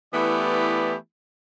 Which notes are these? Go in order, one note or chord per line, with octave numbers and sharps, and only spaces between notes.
E3 A3 B3 E4 G4 D5